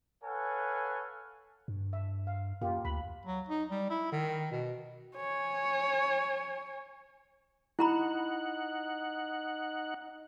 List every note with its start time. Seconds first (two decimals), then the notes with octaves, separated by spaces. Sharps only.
0.23 A4 B4 C#5 F5 F#5 G#5
1.68 G2
1.93 E5
2.27 F5
2.61 F#2 A#3 F4 G4
2.85 D2 B5
3.26 F#3
3.49 D#4
3.70 G3
3.90 E4
4.12 D#3
4.51 B2
5.16 C#5 G#5
7.79 D#4 E4 F#5 A#5 B5